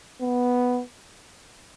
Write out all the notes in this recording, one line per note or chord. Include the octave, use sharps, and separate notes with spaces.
B3